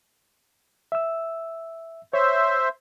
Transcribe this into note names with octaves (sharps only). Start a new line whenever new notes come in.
E5 E6
C5 C#5 E5